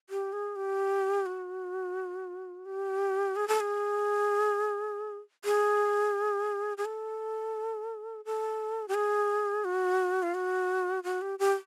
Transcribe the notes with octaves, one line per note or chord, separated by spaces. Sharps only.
G4
G#4
G4
F#4
G4
G#4
A4
G#4
G#4
G#4
A4
A4
G4
G#4
F#4
F4
F#4
F#4
G4
G4